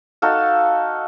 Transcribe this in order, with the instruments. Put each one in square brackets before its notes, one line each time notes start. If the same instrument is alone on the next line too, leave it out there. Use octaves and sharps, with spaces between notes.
[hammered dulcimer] D#4 F#4 A4 F5